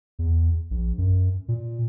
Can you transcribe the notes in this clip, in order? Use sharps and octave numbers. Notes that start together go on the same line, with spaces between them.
E2
A#1
F#2
A#2